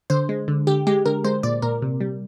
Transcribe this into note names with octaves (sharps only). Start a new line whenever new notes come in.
D3 C5
G#3
D3
D3 G4
G#3 G4
D3 A#4
G#3 C5
A#2 D5
A#2 A#4
C3
G3